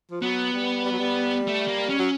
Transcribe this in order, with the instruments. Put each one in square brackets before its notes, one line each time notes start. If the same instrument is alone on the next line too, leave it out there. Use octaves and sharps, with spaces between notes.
[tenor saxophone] F3
[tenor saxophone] F#3 [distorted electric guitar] B3
[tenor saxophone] G3
G3
F#3
G3
[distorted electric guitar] A3
A#3
C#4
[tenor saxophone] F#3